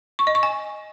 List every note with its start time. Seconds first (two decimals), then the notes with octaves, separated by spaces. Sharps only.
0.19 C#6
0.27 D#5
0.35 C#6
0.43 G#5